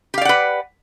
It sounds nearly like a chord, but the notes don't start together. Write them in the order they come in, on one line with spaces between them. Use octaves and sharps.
G4 F5 D5 F#5 B4